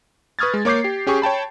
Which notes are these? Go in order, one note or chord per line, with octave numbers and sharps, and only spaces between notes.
B4 C#6 D#6 F6 G#6 A6
G#3
A#3 C#5 D6 G6 C7
G4
C#4 G4 G#4 C#6
C#5 G5 A5 B5